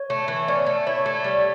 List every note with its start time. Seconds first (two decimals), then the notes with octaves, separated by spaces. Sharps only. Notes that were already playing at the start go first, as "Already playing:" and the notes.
Already playing: C#5
0.10 A3
0.28 E3
0.48 C#4 D5
0.66 A3
0.87 E4 C#5
1.06 A3
1.24 G3